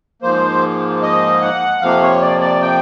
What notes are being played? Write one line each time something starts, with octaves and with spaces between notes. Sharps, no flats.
G#2 F3 A#3 C5
D#5
F#5
F2 C3 F3 A#3 F5
C#5
D5
D5
G5